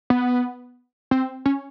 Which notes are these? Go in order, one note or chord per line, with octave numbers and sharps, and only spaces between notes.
B3
C4
C#4